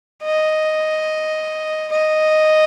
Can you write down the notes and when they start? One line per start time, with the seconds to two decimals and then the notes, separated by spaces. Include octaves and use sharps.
0.24 D#5
1.92 D#5